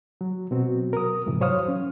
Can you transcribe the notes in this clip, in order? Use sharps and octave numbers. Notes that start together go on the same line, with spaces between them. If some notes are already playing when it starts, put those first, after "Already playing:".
F#3
B2 F#3 C4 F#4
A#4 D#6
F2 G#2 C3 E3
F#3 C5 C#5 F5 D#6 F6
C#4